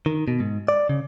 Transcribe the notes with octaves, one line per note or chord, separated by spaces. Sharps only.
D#3
B2
G#2
D5
C#3